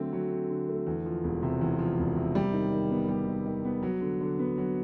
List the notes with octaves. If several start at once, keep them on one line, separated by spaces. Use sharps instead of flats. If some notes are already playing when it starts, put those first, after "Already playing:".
Already playing: D3 F#3 A3 C4
F#3
C4
D3
A3
E2
F3
E1
C3
E2
F3
E1
C3
G3
D#3
D#3
B3
G3
D#3
D#3
B3
F#3
D3
D3
B3
F#3